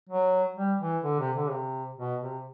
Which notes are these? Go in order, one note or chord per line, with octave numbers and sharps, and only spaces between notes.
F#3
G3
E3
D3
C3
D3
C3
B2
C3